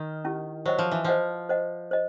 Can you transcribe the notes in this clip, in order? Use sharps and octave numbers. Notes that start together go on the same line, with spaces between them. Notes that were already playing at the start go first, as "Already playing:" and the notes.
Already playing: D#3
C#4 E4 G4
F#3 C5 D#5 F#5
F3
E3
F3 C5 D#5 F#5
C5 D#5 F#5
C5 D#5